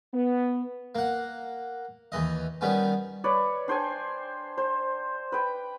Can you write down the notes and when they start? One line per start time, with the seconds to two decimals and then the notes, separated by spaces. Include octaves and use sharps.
0.14 B3
0.95 A#3 F#5
2.12 D#2 E3 D#5
2.61 D#3 G3 B3 C#4
3.24 B4 C#5 D5
3.68 D4 C5 G5 G#5
4.58 C5
5.32 B4 G5